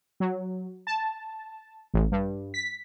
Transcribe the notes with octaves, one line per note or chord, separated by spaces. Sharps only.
F#3
A5
A1
G2
B6